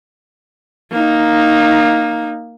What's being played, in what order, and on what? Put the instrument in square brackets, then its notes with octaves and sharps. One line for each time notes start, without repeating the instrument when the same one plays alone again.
[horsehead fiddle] A#3 D#4